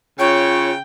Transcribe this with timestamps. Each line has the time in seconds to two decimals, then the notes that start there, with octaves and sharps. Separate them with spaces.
0.19 C#3 F4 C#5 G5